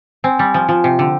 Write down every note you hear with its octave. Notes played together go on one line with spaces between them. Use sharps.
C4 G#5
G3 G#5
F3 G#5
F3 F4
C3 G5
D3 G5